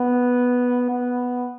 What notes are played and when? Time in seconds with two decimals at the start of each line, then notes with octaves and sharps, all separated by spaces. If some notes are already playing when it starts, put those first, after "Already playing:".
Already playing: B3
0.90 B3